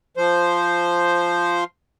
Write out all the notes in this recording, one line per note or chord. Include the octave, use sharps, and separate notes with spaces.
F3 C5